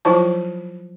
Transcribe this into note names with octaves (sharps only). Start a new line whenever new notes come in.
F3 F#3 E4 F4 C5 A5